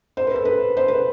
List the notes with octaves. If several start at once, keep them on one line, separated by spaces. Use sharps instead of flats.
C5
B4
A4
B4
C5
B4